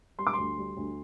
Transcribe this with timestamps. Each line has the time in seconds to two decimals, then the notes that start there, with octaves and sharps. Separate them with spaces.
0.18 G3 C6
0.27 D6
0.33 D2 C6
0.58 G3
0.77 D2